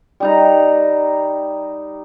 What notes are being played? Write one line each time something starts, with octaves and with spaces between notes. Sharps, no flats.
G3 D#4 A#5